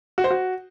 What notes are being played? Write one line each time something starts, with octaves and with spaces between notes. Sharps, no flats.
F#4
C5
F#4